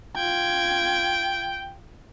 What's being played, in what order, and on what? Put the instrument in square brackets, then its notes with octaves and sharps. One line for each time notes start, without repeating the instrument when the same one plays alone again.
[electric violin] F4 G#6 [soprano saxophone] G5